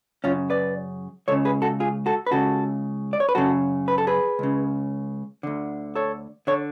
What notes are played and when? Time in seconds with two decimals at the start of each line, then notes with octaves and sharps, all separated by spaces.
0.24 F#2 C#3 C#4 F4
0.50 B4 D5
1.28 C#2 A4 C#5
1.32 C#3
1.45 G#4 B4
1.62 F#4 A4
1.80 F4 G#4
2.06 F#4 A4
2.27 B4
2.32 C#2 C#3 F#4 A4
3.13 D5
3.20 C#5
3.29 B4
3.35 F#2 C#3 F#4 A4
3.88 B4
3.98 A4
4.07 G#4 B4
4.39 C#2 C#3
5.43 D2 D3
5.95 A4 C#5
6.47 D3 A4 C#5